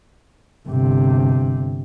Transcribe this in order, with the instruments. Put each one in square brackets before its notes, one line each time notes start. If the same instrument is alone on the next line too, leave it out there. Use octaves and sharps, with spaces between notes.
[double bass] G1 C3